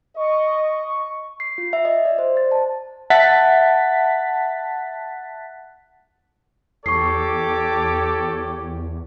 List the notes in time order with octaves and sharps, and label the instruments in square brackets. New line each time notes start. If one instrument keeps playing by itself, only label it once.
[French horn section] D#5 [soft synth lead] C#6
[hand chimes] C7
F4
E5
D#5
D5
C5
A6
A5
[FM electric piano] E5 F#5 A5 F#6 A6 B6
[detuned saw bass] E2 [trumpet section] G4 C#5 D6 [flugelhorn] A4 [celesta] C#6 C7